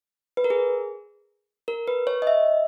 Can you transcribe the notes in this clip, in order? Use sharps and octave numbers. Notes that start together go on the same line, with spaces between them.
B4
A#4
G#4
A#4
B4
C#5
D#5
E5